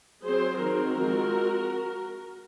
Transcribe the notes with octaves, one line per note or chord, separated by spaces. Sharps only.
F#3 C4 G#4 C5
D#3 F#3 C4 F#4 A#4
F3 G#3 C4